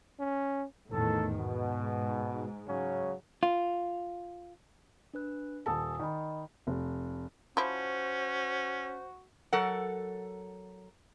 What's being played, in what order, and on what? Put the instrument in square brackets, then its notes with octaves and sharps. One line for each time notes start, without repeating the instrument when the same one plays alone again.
[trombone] C#4
[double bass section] E2 A2 D#3 [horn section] A4 A5
[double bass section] G#2 [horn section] B2
[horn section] C#3 F#3 C#4
[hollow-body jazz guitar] F4
[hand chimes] D4 B4 F#6
[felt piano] D#1 A4 A5 [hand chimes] G#5 D#6
[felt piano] D#3 [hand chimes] D5 D#5 B5
[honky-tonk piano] F1
[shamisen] F3 E4 [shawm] C#4 [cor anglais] F#4 [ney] C5
[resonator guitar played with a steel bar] F#3 A4 A#4 F#5